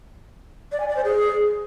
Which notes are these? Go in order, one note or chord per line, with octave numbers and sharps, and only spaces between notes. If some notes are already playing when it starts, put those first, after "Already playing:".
D5
G#5
D5
C5
G#4